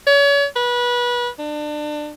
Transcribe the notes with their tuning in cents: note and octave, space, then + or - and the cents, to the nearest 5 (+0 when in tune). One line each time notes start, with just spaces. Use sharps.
C#5 +35
B4 -25
D4 +30